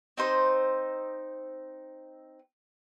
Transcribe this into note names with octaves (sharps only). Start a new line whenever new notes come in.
C4 D#4 C5